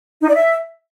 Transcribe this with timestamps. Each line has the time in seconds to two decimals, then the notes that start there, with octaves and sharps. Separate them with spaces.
0.22 D#4
0.28 D5
0.34 E5